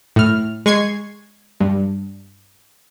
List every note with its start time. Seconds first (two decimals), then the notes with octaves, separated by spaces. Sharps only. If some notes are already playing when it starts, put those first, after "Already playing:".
0.16 A2 F6
0.66 G#3 C#6 G#6 C7
1.60 G2